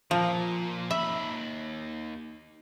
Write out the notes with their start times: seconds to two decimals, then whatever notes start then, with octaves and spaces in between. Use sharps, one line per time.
0.11 A#2 F3
0.91 D#2 E5 B5